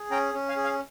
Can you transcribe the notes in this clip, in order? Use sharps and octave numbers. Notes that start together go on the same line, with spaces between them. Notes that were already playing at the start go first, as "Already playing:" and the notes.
Already playing: G#4
C#4 G5 A#5
C#4
F5 G#5
G#4
F5 G#5